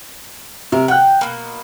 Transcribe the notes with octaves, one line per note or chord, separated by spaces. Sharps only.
C3 A#4
F#5 G5 F#6
B2 A#3